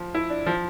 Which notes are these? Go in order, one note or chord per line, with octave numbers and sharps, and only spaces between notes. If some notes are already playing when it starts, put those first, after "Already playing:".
Already playing: F3
E4
D4
F3